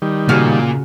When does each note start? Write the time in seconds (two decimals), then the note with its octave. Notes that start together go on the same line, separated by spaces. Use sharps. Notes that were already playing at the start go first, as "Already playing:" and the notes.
0.02 D#3 G3
0.29 A#2 C#3 F#4 F5